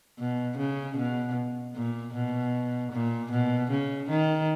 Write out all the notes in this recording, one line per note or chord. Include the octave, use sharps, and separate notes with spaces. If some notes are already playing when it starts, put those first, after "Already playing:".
B2
C#3
B2
A#2
B2
A#2
B2
C#3
D#3